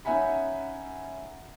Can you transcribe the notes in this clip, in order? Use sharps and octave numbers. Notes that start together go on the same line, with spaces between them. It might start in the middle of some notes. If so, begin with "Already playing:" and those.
C#4 D#4 E5 F#5 G#5 B5